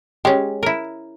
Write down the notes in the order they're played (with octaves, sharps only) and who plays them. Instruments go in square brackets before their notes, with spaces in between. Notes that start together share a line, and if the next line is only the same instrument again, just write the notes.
[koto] G#3 C#4 [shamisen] G4
[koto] E4 A#4